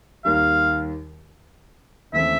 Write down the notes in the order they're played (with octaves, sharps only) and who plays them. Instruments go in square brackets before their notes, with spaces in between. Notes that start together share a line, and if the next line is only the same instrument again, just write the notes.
[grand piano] D#2 D#3 G3 [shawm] F5
[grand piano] D#2 C#3 E3 A3 C4 [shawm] E5